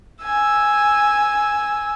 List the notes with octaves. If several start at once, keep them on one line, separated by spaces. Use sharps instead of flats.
G#5 E6